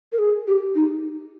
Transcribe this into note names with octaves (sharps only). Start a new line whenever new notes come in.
A#4
G#4
G4
D#4